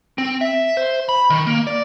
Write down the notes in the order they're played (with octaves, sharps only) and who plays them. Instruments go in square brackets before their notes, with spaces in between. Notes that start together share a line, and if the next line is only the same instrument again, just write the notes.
[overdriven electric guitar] C4
E5
C5
B5
D#3
A#3
D5